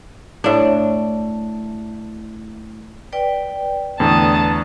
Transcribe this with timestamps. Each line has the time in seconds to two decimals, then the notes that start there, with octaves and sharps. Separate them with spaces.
0.44 A2 D4
3.12 B4 D5 G5
4.00 E2 A2 D3 A5 D#6